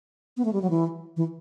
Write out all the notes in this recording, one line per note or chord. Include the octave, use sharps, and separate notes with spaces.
B3
A3
G3
F#3
E3
E3